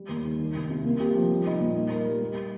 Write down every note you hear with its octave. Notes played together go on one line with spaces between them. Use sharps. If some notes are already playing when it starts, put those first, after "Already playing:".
Already playing: G3
D#2
D#3
D#3
C2
C3
A#3
G4
F3
G3
D#4
A#2
D#4
A#4
G3
G3